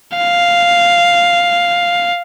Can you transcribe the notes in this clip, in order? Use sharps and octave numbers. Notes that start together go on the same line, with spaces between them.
F5